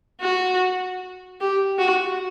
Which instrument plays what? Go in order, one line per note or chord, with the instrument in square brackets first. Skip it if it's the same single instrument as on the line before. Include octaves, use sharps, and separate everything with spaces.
[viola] F#4
G4
F#4